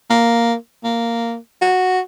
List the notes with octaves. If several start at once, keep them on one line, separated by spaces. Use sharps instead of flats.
A#3
A#3
F#4